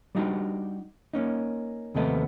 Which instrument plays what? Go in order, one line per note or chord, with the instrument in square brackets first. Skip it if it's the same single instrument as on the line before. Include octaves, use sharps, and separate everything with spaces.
[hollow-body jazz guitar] G3 D4 D#4 F#4 G4
A#3 C#4 D#4
D#2 C3 F3 A3 B3 D#5